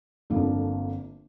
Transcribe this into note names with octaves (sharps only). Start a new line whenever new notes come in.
G1 F2 D3 F3 A#3